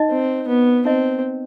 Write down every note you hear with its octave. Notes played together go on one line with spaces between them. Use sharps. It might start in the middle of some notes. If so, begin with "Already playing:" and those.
Already playing: D#4 D#5
C4
B3
C4 D#4 D#5